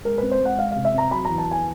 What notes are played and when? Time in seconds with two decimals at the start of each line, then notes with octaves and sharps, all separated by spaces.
0.05 G#3 A#4
0.18 C4 B4
0.31 C5
0.41 G#3 F#5
0.58 G#3 F5
0.71 C3 F5
0.85 E5
0.94 C4 A#5
1.11 F#3 B5
1.25 E2 A#5
1.38 A5
1.47 B3 G#5